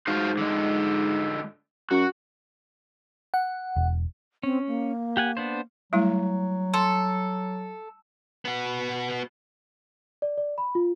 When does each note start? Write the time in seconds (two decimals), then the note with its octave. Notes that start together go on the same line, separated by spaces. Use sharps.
0.07 G#2 F#4 C5 F5
0.37 D3 G#3
1.91 F#2 F#4
3.34 F#5
3.76 E1
4.43 C4 C#4
4.68 A#3
5.17 G4 F#5 G#5
5.37 B3 D4 C5
5.93 F#3 G3 A3 E4
6.74 A4 C6
8.45 B3 F#4
10.22 D5
10.38 D5
10.58 B5
10.75 F4